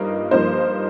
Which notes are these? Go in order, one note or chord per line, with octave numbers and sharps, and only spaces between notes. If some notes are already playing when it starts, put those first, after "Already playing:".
Already playing: G2 F3 A#3 D#4
G2 F3 A#3 D#4 C5